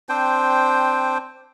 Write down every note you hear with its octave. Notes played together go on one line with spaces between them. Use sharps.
C4 D4 C5 G5